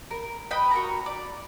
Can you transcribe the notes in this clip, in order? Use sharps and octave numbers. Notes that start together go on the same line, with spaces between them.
A#4
B4 D#5 G5 B5
F#4 A#4 A#5
D5